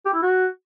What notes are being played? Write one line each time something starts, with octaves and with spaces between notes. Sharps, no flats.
G4
E4
F#4